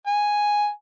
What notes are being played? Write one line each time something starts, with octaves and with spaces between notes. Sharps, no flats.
G#5